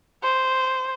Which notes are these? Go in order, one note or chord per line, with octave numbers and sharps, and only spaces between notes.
C5